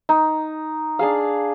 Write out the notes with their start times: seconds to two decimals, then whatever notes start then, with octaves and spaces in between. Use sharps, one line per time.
0.09 D#4
0.99 D4 G#4 F5